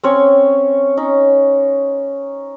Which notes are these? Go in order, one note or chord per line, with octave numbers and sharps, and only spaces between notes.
C4 C#4 C#5
C#4 D#4